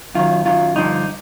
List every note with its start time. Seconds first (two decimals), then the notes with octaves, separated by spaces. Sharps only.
0.14 F#2 D#3 F#3 F4
0.45 F#2 D#3 F#3 F4
0.76 G2 D3 F3 D#4